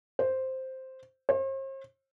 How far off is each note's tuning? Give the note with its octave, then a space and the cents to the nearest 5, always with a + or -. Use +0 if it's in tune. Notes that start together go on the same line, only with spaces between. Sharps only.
C5 +0
C5 +45